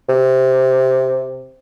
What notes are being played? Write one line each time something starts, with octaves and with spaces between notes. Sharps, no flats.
C3